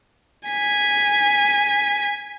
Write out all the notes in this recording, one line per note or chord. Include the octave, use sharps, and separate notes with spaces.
G#5 B6